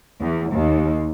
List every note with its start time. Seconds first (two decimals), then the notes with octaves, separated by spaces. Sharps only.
0.20 E2
0.52 D#2